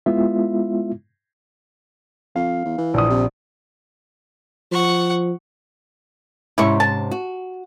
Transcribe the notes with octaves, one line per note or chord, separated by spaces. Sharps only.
G#3 B3 E4 F4 E5
F2 F5
E2
E3
A#1 D#6
C3
F3 F#5 C#6
G#2 C3 C#4 E4 C#6
A5
F#4